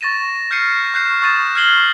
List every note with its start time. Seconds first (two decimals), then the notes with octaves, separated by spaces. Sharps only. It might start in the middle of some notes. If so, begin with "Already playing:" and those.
0.01 C#6 A6 A#6 D#7 E7
0.51 F6 G6 A#6 C7 C#7 D#7
0.94 C#6 F#6 G6 C7 E7
1.22 C#6 D#6 A6 D#7 E7
1.55 F6 G#6 C7 F#7 G7
1.77 C#6